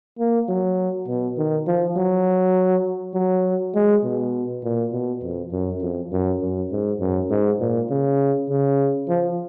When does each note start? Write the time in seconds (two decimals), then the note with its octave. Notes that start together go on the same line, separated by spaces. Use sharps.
0.19 A#3
0.48 F#3
1.08 B2
1.37 D#3
1.67 F3
1.96 F#3
3.14 F#3
3.75 G#3
4.03 B2
4.64 A#2
4.92 B2
5.23 F2
5.52 F#2
5.81 F2
6.12 F#2
6.41 F#2
6.71 G#2
7.00 F#2
7.30 G#2
7.60 A#2
7.90 C#3
8.49 C#3
9.09 F3